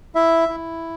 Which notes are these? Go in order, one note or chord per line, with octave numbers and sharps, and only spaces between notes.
E4 E5
E4